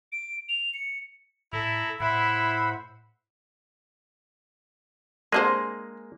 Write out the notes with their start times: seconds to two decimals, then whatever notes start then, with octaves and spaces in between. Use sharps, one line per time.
0.12 D7
0.49 F7
0.74 C#7
1.53 A2 E4 A4 A#5
2.00 A2 E4 C5 E5 F#5 B5
5.32 G#3 A#3 C4 D4 G#4 C5